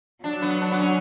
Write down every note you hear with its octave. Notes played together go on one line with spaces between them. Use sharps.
F#3 D4
B3
D4
B3
C#4